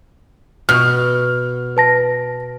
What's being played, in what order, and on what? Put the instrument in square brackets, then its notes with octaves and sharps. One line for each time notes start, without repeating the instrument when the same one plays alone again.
[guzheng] B2 [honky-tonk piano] F6
[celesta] B4 A5 A#6